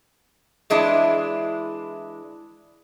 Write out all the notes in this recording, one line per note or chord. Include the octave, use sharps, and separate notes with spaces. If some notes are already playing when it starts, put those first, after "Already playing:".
E3 G#3 D4 E4